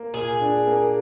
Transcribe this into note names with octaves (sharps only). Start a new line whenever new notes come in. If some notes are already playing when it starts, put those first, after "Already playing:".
Already playing: A#3
A#2 G#4
D4
A#3